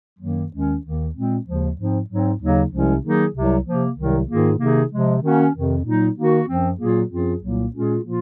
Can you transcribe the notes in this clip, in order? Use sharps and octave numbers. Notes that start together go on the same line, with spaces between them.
F#2 D#3 F#3 A#3
D#2 D#3 G#3 C#4
D#2 D#3 A#3
A#2 G#3 C4
D#2 C#3 F3 G#3
G#2 F3 C4
G#2 F#3 C4
D#2 C#3 F#3 A#3 D#4
C2 C3 F3 G#3 C#4
D#3 F#3 A#3 D#4 G#4
C2 C3 F#3
C3 F3 A#3
C2 C3 D#3 F#3
G#2 D#3 A#3 F4 G#4
C3 D#3 A#3 D#4 G#4
C3 F3 G#3
D#3 A#3 C#4 F#4
F2 C3 D#3
A#2 F#3 A#3 D#4
D#3 A#3 D#4 F#4
F#2 F3 C4
A#2 F#3 A#3 F4 G#4
F#2 F3 C4 F4 G#4
C2 A#2 F#3 A#3
A#2 G#3 C#4 F4 G#4
A#2 F3 A#3 F4